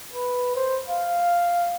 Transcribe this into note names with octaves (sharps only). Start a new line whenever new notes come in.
B4
C5
F5